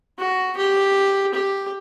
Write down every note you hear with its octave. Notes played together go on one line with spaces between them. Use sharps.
F#4
G4
G4